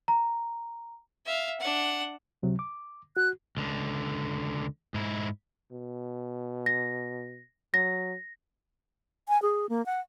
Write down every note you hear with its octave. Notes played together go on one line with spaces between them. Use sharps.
A#5
E5 F5
D4 F#5
C#2 C3 F#3
D6
F#4 F#6
C#2 D3
G#2 E4
B2
A#6
F#3 A#6
G#5
G#4
A#3
F#5